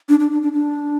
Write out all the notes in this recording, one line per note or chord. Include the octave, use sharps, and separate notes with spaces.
D4
D4
D4
D4
D4